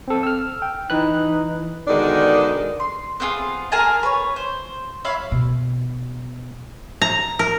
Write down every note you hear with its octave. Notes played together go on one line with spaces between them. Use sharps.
C4 A4
E6 F6
G5
E3 D#4 B4 F#6
B2 D3 D#3 G#3 D4 D5
C6
B3 C4 F4 G#4
G#4 A#4 G#5 A5
B4 C#5
C5
C#5 E5 F5 B5
B2
A#5
A#4